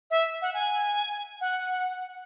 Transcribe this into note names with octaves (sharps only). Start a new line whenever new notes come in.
E5
F#5
G#5
F#5